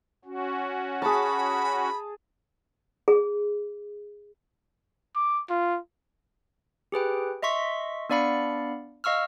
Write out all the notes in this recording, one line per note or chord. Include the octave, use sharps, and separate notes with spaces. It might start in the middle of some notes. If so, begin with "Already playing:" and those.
C#4 F#4
G#4 A5 B5
G#4
D6
F4
G4 G#4 B4 G5
D#5 E5 C6 C#6 B6
B3 D4 D5 F5 B5 C#7
D#5 F5 C#6 E6 F6